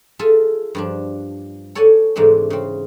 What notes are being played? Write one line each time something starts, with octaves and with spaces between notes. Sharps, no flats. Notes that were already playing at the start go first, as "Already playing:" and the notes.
F4 G#4 A4 E5 G#5
G2 F3 D4
A4 C#5 D5 F#5 G#5
G#2 C3 E3 G#3 A3 D4
C#3 C4